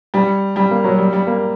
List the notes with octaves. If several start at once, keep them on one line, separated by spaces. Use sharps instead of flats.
G3
G3
A#3
F#3
G3
G3
A#3